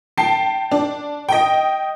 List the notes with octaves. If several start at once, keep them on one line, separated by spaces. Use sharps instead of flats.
G5 A5 C7
D4
D#5 G5